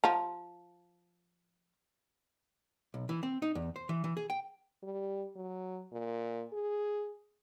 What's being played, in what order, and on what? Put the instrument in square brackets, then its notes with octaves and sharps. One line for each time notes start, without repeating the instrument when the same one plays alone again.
[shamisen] F3 A#5
[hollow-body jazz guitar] B1
E3
C4
D#4
E2
C5
E3
E3
G#4
G5
[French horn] G3
F#3
A#2
G#4